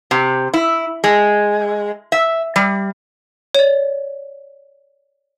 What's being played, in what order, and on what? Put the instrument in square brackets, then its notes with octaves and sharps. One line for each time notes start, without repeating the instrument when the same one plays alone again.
[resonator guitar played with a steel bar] C3
E4
G#3
E5
G3
[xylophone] C#5 D5